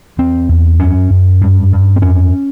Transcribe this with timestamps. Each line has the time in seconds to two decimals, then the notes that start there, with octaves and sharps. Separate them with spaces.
0.18 E2 C4
0.49 E2
0.79 F#2 C#4
1.10 F#2
1.41 G2
1.72 G2
1.96 C4
2.02 F2 C#4